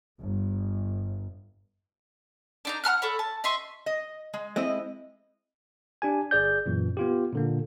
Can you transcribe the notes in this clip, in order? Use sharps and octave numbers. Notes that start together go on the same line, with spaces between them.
G1
D4 D#4 A#5
F#5 A#5 F6 F#6
A4 C#5 B5
A5
D#5 E5 C6 C#6
D#5
G#3
G#3 C4 E4 D#5
D4 G4 G#5
G1 G#4 D5 G6
F#2 A#2 E3
B3 F4 G4
A#2 D3 A#3